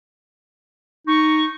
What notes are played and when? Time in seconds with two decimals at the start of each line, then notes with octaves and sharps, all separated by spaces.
1.07 D#4 C#6